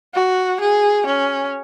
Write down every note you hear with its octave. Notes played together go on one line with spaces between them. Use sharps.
F#4
G#4
C#4